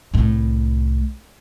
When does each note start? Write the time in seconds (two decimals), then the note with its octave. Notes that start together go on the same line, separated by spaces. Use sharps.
0.14 C2 A2